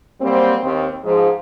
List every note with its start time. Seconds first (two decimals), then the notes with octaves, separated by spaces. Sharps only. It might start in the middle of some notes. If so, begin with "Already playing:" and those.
0.21 F#3 G3 A#3 C4
0.62 D#2 C4
1.04 G#2 F3